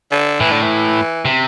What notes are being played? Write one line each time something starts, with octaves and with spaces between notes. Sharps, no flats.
D3
A2 E3
D3
E3
C3